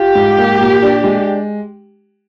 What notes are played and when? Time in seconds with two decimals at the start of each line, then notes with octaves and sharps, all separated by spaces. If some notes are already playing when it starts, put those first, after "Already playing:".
Already playing: F4 G4
0.15 G#2
0.38 A#3
0.61 A#2
0.83 D4
1.04 G#3